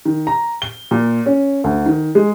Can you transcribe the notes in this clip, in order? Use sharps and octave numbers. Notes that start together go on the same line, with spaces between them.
D#3
A#5
G7
A#2
C#4
D2
D#3
G#3